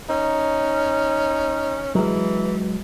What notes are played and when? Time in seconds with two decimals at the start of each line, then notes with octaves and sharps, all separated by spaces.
0.09 C#4 D#4
1.95 E3 F#3 G#3